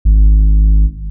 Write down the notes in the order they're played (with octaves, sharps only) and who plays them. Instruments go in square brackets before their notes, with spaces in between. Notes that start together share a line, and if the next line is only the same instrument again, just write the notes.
[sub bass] G#1